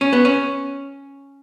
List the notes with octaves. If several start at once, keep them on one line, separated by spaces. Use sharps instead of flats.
C#4
B3
C#4